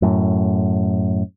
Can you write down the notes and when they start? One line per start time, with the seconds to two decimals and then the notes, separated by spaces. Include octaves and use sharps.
0.02 F#2 A2